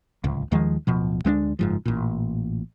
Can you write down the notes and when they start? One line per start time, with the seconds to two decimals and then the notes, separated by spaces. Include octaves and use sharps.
0.24 D1 C#2
0.52 D#2 D#3 F3 G#3
0.87 D1 B2 F3
1.25 D2 G#3 A#3 D4
1.59 F#1 G#2 F3
1.85 A1 A#2